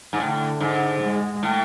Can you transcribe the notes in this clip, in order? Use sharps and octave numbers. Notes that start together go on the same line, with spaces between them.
G#2
A2 D3
G#2
G#3
A2